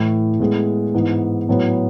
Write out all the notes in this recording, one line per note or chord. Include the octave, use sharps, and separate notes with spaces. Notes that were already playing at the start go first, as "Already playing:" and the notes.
Already playing: A2 E3 A3
A2 G#3 B3
G#2 E3 B3 E4
A2 F#3 B3